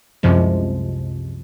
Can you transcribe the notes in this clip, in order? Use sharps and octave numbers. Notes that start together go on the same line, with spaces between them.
C2 F#2 C3 F3 G#3